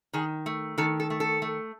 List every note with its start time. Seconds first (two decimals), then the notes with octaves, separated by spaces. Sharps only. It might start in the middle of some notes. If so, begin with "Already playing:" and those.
0.13 D#3 G#4
0.46 A3
0.78 D#3 A4
1.00 A4
1.10 A3
1.20 A4
1.42 A3